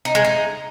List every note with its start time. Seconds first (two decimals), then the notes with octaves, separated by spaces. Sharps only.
0.05 D#4
0.15 G#3
0.25 D#4